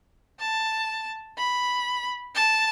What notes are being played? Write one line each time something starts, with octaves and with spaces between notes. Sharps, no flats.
A5
B5
A5